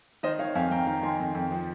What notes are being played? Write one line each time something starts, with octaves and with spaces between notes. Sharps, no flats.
D#3 C5 D#5
D#3 C#5 F5
F2 F5 G#5
F2 G5 A#5
D#3 G5 A#5
D#3 G#5 C6
F2
F2
F3